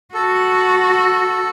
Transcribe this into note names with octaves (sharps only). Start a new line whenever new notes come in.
F#4 A4